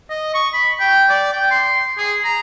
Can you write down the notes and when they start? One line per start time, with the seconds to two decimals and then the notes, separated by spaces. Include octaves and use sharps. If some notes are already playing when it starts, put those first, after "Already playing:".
0.10 D#5
0.34 C#6
0.54 B5
0.80 G5
1.09 D5
1.33 G5
1.51 C6
1.98 G#4
2.25 A#5